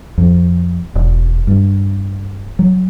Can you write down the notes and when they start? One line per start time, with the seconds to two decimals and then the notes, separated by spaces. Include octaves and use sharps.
0.18 F2
0.96 E1
1.47 G2
2.59 F#3